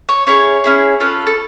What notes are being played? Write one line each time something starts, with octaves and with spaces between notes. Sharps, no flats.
C#5
C#4 E4 G#4 C#5
C#4 E4 G#4
C#4 F4 A4 B4
A4